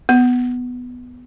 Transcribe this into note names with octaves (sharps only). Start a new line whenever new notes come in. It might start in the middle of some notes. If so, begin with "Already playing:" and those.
B3